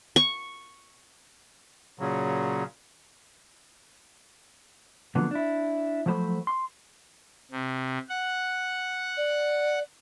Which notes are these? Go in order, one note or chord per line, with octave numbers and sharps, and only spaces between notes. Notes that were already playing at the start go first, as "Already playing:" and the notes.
C#6
A#2 C#3 F#3
D3 F3 F#3 A#3 B3
D4 E4
F3 F#3 A3 C5 B5
C6
C3
F#5
D5